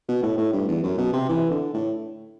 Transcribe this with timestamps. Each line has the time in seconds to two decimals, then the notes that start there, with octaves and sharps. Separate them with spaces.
0.09 B2
0.23 A2
0.38 A2
0.53 G2
0.68 E2
0.83 F#2
0.98 B2
1.13 C3
1.29 E3
1.50 D3
1.74 A2